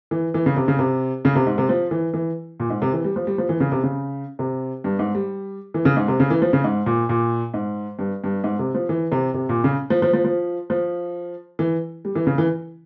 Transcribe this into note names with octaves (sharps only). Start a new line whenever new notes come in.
E3
E3
C#3
C3
C#3
C3
C#3
C3
G#2
C3
F3
E3
E3
A#2
G#2
C3
E3
G3
F3
G3
F3
E3
C#3
C3
C#3
C3
G2
G#2
G3
E3
C#3
G#2
C3
C#3
E3
F3
C#3
G#2
A#2
A#2
G#2
G2
G2
G#2
C3
F3
E3
C3
C3
A#2
C#3
F3
F3
F3
F3
F3
E3
G3
E3
C#3
E3